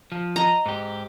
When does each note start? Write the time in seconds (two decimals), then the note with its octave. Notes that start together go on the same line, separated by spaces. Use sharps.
0.12 F3
0.36 D#5 A#5
0.66 G#2 G4